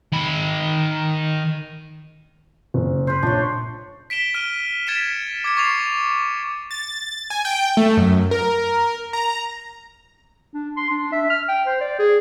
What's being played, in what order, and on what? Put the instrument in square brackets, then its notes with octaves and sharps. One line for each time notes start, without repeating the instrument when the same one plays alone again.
[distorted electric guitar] D#3 B5
[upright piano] F#1
[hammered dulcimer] B4 C5
[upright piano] A#1 [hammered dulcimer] D4 C#5
[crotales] B6 D7 E7 G7
F6 D#7 G7
G#6 A6 B6 C#7 D7 E7
D6 G#6 C#7
C#6 D6 A6 C7 F7
[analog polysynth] A6
G#5
G5
A3
F#2
A#4
A#5
[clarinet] D4
C6
D4
E5
F6
G5
C5
D5
G#4